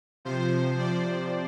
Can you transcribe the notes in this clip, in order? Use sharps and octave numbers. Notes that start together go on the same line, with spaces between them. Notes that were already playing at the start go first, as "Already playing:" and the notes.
C3 F3 C5
D5